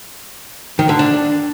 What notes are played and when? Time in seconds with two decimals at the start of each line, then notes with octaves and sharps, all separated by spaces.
0.79 D#3
0.89 D3
0.99 D4